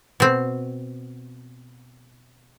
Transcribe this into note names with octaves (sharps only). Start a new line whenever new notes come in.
B2 C4